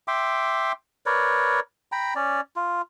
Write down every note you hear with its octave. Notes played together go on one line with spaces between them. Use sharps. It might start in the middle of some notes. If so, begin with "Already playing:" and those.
E5 G5 C6 D6
A#4 B4 C#5 D5
G5 A#5 B5
C#4 D5
F4